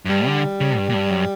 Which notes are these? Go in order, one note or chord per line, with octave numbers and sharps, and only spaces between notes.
F#2
G2 G3
D3
C#3
G2
A#2
G2
F#2